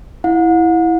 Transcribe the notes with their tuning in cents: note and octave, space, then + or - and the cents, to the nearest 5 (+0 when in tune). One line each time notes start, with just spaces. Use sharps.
E4 +0 F#5 -40